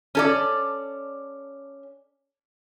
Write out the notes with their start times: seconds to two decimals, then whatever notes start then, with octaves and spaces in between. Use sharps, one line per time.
0.15 C#4 A4 D5